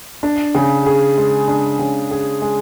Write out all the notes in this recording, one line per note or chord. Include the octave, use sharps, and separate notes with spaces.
D4
C#3
G#4
G#3
D4
C#3
G#4
G#3